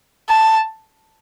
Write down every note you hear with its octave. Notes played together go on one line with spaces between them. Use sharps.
A5